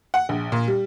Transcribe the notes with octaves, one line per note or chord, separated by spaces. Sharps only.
F#5
A#1
A#2
G3